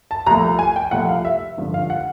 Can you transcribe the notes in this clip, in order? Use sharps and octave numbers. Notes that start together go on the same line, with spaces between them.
A5
C2 C3 F3 A3 A#5
G#5
G5
C2 C3 F3 A3 F#5
F5
E5
G#1 G2 D3 F3
F5
F#5